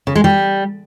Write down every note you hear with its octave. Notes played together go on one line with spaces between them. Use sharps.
C#3
G#3
G3